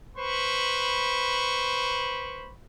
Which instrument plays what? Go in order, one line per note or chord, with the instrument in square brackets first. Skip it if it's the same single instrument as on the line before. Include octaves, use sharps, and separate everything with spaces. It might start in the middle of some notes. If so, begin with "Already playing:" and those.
[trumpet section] B4 C5 B5 C#6